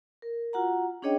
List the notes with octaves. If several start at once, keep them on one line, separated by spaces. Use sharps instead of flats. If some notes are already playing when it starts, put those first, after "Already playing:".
A#4
F4 F#4 F#5 A#5
C#4 D4 G#4 C#5 D#5 G5